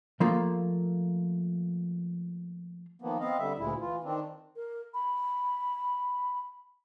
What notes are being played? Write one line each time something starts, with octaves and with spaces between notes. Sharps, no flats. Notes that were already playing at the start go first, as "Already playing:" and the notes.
F3 A3 A#3 F4
D#3 F3 A#3 B3
B3 C4 D#5 F5
D3 G3 E5
D2 A#2 G#3 E4
E3 F4
D#3 C4 D4
A#4
B5